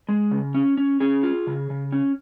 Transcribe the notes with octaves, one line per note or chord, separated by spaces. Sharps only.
G#3
C#3
C#4
C#4
C#4 G#4
F4
C#3
C#3
C#4